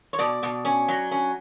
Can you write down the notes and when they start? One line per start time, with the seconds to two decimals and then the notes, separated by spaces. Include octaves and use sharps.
0.13 C#5
0.19 B2 D5
0.43 B2
0.65 C#4
0.88 F#3
1.11 C#4